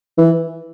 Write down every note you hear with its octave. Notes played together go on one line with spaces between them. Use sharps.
E3